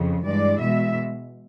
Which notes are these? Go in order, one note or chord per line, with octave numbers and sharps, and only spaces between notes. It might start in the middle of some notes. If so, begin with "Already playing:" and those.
Already playing: F2 C#3
G2 E3 G#3 D5
B2 G#3 E5